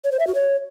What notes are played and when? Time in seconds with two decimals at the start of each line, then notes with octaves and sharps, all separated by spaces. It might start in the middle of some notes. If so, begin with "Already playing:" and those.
0.04 C#5
0.12 C5
0.19 E5
0.27 F#4
0.35 C#5